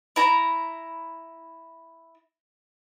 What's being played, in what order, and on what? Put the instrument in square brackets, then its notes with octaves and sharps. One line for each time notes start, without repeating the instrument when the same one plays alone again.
[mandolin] E4 A#5